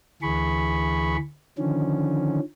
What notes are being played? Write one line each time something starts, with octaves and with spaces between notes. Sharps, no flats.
D2 E3 G#4 B5 C#6
D3 D#3 F3 C#4